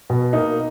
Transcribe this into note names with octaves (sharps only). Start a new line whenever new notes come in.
B2
A#3 D#4